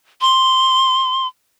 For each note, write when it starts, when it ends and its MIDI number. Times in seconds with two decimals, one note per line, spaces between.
0.21 1.27 84